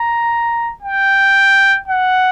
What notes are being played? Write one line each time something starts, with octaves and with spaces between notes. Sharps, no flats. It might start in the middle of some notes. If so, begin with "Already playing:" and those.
Already playing: A#5
G5
F#5